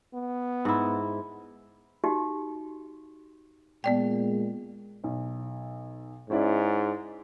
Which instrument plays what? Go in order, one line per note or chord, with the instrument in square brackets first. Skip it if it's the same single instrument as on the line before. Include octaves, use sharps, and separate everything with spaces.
[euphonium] B3
[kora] G#2 E4
[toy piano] D#4 F#4 G4
[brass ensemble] A#2 G#3 [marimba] B3 D5 G5
[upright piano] B1
[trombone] G#2 [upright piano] C#4 E4 D5